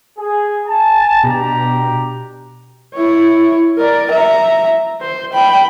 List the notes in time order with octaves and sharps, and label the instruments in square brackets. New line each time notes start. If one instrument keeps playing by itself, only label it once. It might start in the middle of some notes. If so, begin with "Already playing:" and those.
[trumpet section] G#4
G#5 A5
[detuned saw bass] B2 [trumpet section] D4 G4 A#5
[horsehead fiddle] E4 C#5
A#4 D5
E5 A#5
C5
G5 B5